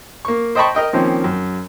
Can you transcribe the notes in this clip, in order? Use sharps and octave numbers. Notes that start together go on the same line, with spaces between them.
A#3 C#6
C5 D#5 G5 A5 B5 C#6
A#4 D#5 G5
D#3 F3 A#3 C4 C#4
F#2